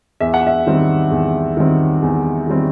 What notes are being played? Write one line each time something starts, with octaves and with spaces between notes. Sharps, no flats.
E2 E5
F#5
E5
D#3 G3 C4
E2
D#3 G3 C4
E2
D#3 G3 C4